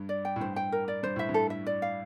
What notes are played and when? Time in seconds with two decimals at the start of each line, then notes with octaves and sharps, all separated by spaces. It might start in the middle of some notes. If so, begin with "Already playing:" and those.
Already playing: G2
0.09 D5
0.25 G5
0.36 A2
0.40 G2 C5
0.56 G5
0.72 A#4
0.88 D5
1.03 G2 C5
1.16 A2 E5
1.29 G2
1.34 A4
1.50 E5
1.66 D5
1.82 F5